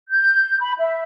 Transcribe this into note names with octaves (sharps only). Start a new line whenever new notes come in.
G6
B5
E5